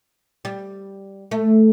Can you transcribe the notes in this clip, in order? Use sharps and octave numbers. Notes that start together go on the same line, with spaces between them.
G3
A3